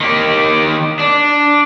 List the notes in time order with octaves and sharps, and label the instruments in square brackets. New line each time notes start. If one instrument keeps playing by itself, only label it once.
[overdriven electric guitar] D#3 G4
D4